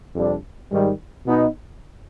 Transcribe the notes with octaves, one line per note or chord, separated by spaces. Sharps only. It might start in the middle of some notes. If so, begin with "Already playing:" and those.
F2 C3 G3 D4
G#2 D#3 G3
B2 B3 D#4